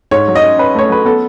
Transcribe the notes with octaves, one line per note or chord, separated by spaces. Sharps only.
G#2 C#5
F#3
D#5
C#4
C#4 B4
A3 C#5
F#3 B4
B3 A4